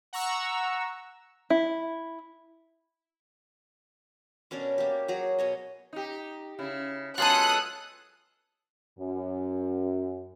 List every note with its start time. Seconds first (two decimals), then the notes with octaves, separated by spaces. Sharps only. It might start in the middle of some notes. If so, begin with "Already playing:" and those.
0.13 F#5 A#5 C#6 E6
1.50 E4
4.51 B2 C#4 D4 A#4
4.78 A#3 G4
5.08 F#3 F#4 G#4 A#5
5.39 B2 C#5 D#5
5.93 D#4 G4
6.59 C#3 E4
7.18 F#3 G#3 B3 F4 G#4 A4 D#6 F#6
8.98 F#2